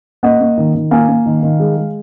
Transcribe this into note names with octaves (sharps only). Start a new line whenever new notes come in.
A#3 D#5 F#5
A#3
D#3
D#3
A#3 F5 G#5
A#3
D#3
D#3
G#3
G#3